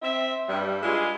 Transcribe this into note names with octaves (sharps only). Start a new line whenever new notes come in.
C4 E5
G2 G3
G#3 D4 E4 F4 G#4